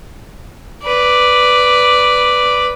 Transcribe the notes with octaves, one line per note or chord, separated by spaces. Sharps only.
B4 D5